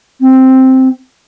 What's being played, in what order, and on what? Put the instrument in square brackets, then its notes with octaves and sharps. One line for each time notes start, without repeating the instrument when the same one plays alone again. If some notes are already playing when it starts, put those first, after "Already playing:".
[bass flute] C4